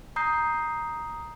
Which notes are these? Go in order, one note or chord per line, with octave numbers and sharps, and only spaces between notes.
A#5 D#6 G6 C7